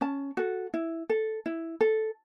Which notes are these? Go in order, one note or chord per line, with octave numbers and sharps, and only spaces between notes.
C#4 A5
F#4 A4
E4
A4
E4
A4